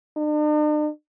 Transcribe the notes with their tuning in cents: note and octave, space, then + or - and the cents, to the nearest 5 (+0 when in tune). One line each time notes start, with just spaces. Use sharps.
D4 +45